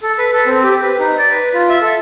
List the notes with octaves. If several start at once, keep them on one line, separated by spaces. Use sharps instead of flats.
A4
B4
A4
C4
G4
B4
D#4
D5
B4
F4
E5
A4